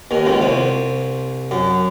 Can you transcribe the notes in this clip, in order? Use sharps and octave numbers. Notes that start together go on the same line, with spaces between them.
D#2 D#3
C#2 C#3
C2 C3
F#2